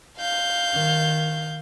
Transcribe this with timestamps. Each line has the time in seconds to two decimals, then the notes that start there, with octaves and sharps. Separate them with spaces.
0.18 F5 G6
0.73 D#3